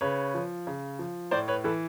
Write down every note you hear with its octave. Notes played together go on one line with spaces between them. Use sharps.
C#3 B4 C#5
F3
C#3
F3
A2 C5 D5
B4 C#5
E3 A4 B4